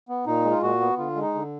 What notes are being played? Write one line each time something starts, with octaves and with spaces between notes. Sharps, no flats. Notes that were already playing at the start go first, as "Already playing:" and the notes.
B3
A#2 D#4
G#3
F4
A#2 F#4
B3
D3 F4
G#3
D#4
D3